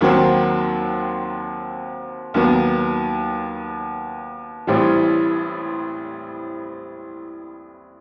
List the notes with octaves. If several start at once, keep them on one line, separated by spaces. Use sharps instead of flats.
D#2 D#3 F#3 C4 F#4
D#2 D#3 F#3 B3
A1 A2 E3 G3 C4